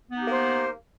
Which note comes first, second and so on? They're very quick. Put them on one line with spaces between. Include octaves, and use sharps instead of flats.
B3 D#4 G4 A#3 C5